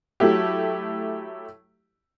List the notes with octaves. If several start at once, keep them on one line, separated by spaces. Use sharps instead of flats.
F#3 A3 E4 G4